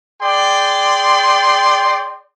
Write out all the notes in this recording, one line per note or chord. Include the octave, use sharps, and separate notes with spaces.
G#4 D5 G5 C6